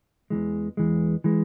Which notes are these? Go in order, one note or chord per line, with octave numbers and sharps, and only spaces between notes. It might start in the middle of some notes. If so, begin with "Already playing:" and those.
E2 E3 G#3
E2 E3 G#3
E3 G#3